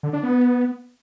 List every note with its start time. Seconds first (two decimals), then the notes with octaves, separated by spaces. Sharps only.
0.03 D3
0.13 D4
0.23 B3